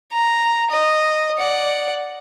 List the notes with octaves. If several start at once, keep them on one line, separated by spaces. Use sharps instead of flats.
A#5
D#5
D5 F#5